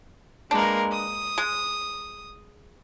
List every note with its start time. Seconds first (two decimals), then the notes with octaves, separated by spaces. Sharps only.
0.51 G#3 A#3 D4 A#4 B4
0.92 D#6
1.38 G#3